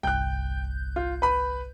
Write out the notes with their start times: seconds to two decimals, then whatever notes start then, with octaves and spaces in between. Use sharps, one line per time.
0.03 G1 C2 G5 F#6 G6
0.96 F4
1.22 B4 B5